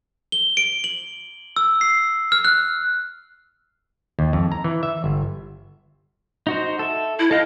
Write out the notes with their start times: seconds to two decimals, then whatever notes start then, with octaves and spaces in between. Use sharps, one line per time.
0.32 G7
0.57 D7
0.84 F#7
1.56 E6
1.81 C7
2.32 F6
2.45 F#6
4.19 D#2
4.33 F2
4.52 A#5
4.64 E3
4.83 E5
5.04 G1
6.47 D#4 F#4 C5
6.79 A4 E5
7.19 E4
7.31 A4 D#5 F5 G5